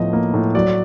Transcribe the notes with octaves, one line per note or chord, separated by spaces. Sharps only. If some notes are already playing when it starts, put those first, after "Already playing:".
Already playing: A2 F3 B3 D#5
A#3
A2
F#3 D5